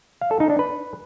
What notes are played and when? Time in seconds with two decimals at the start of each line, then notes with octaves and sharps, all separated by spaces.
0.21 F5
0.31 A4
0.40 D#4
0.50 D4
0.59 B4